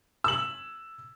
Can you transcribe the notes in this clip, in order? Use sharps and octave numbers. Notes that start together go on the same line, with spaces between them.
E6 F#7